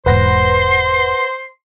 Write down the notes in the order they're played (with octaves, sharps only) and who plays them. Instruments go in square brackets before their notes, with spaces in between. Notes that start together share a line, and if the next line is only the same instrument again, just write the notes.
[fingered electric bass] E1 G#2 [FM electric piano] B4 F#5 A#6 [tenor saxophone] C5 [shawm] C6